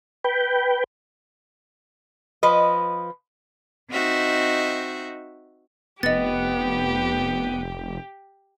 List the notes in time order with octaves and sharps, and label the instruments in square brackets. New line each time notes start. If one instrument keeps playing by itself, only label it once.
[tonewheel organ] B4 G5
[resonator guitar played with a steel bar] F3 B4 D#5
[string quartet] C4 D#4 F#4 D#5 E5
[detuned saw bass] F1 [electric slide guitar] B3 [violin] G4 [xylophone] D#5 A6